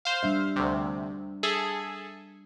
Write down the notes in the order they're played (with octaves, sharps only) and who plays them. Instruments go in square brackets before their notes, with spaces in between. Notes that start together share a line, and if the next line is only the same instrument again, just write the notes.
[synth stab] C5 F5
[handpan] G3 D4 E5
[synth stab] D2 C3 [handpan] G3
[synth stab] G#4 A4 E5